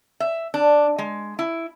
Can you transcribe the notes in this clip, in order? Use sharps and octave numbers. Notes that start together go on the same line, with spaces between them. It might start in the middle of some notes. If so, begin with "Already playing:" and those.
E5
D4
G#3
E4